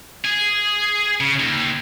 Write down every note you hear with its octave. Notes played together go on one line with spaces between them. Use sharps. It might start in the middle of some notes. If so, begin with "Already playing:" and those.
G#4
C#3
D#2